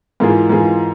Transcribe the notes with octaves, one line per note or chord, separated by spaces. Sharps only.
G#2 E3 A#3 F4 G#4
G#2 E3 A#3 F4 G#4